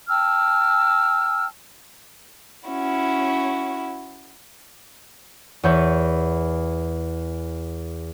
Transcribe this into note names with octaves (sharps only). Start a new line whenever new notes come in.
G5 A5 E6 F6
C#4 E4 F#4
E2 B4 C#5 E5 G6